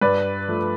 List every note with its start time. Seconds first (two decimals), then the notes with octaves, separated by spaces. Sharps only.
0.01 G2 B4 D5
0.48 F3 A3